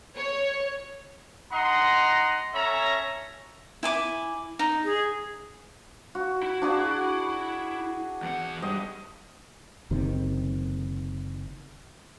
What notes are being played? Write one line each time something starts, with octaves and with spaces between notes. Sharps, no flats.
C#5
D#4 D#5 F#5 A#5 C6
C#4 A4 C#5 E5 G#5 A#5
E4 G#5 D6
D#4
G#4
F#4
E4
D4 F#4 G#4
E2 F#5
G2 D#5
F#1 C3 D#3